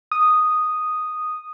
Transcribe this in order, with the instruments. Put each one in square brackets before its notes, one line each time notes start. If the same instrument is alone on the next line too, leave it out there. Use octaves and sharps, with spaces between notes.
[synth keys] D#6